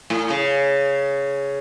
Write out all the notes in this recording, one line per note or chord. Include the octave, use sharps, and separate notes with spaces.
A2
C#3